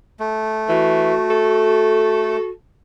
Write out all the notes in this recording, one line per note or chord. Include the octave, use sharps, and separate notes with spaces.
A3
E3 F#4
A4